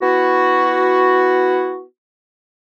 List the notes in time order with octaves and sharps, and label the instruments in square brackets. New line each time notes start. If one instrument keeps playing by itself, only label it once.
[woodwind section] B3 E4 F#4